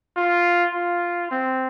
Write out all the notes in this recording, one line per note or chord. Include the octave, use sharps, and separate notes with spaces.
F4
F4
C4